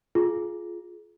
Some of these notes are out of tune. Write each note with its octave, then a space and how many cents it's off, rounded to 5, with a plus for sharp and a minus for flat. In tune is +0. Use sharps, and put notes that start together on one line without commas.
F4 +0 G#4 +25